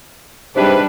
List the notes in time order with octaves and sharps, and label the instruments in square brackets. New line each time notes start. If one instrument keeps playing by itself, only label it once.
[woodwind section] G#2 C3 B4 [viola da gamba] G3 D4